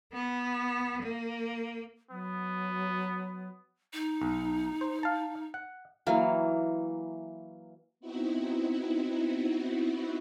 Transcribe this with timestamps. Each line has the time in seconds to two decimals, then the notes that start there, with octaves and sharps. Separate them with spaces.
0.13 B3
1.02 A#3
2.11 F#3 B3
3.93 D#4
4.22 B1
4.81 C5
5.03 F5 A5
5.54 F#5
6.07 E3 F#3 A#3
8.00 B3 C4 D#4 E4 F#4